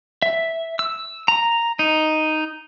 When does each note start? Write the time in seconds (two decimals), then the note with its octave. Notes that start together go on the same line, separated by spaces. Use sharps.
0.22 E5
0.79 E6
1.28 A#5
1.79 D#4